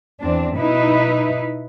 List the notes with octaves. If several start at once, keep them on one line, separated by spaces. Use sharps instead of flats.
E2 C4 D4
B2 D#4 E4 B4